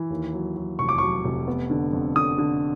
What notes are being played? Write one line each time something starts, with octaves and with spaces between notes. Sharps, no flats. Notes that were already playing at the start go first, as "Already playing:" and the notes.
Already playing: E3
D#2
F#3
F#3
F1 C#6
D6
F#3 C#6
F1
B3
D3
F2
D3 D#6
D3